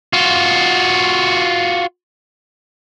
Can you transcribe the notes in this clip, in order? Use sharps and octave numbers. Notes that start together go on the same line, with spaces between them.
F4 F#4